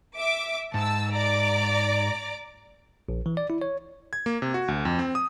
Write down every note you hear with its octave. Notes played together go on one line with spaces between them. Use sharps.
E5 D6
G#2 A5 E6
D5 A#5 D6
A#1
E3
D5
E4
C#5
G#6
A#3
C3
F#4
D2
F2
C4
D#6